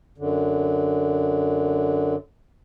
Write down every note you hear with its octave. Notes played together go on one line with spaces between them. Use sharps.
F#2 D3